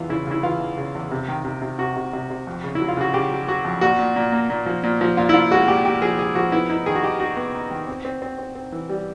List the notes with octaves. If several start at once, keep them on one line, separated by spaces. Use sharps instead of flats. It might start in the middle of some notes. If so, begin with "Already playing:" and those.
Already playing: E2 E3 F4
C#3 E4
C#3 E4
E3 F4
E2
C#3
E2
C3
D#3
C3
C3
C3 F#4
C3
C3
C3
F2
C#3
E4
F#3
F4
C#3 F#4
C#3 G4
F#3
F#3 F#4
F2
A#2 F#4
A#2
A#2
A#3
A#2
F3
A#2
F3
A#2 F4
E4
A#2 F4
G#3 F#4
A#2 G4
A#2 G4
F3 G#4
G#3 G#4
F3 F#4
B3 E4
D#4 E4
D#3 G#4
F#4
D#4 G4
D#4 F#4
B3
D#4
D#3
C4
C4
C4
C4
C4
E3
G3